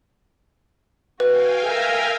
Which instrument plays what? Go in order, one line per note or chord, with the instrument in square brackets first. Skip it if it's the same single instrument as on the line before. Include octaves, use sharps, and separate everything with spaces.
[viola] F#4 [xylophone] B4 [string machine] F5 G5 G#5
[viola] A#4 E5